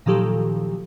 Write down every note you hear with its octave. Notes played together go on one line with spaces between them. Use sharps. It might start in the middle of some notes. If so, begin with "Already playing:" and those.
A#2 D#3 F3 F#3 G4 A4